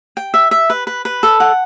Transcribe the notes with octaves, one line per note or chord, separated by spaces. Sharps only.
G5
E5
E5
B4
B4
B4
A4
F#5